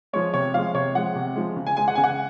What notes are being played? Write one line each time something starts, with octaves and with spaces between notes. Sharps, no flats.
F3 G#3 C#5
C3 C#5
F3 G#3 F5
C3 C#5
F3 G#3 F#5
C3
F3 G#3
C#3
G#5
G#3 G#5
F#5
C#3 G#5
F#5